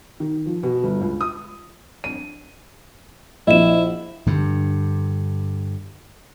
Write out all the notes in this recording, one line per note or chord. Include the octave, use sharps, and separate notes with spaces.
D#3
F3
B2
G1
C#2
D#6
D#7
A#1 E4 D#5 E7
G2 D3